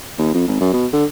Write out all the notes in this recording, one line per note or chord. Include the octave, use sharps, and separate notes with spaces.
D#2
F2
G#1
F#2
B2
D3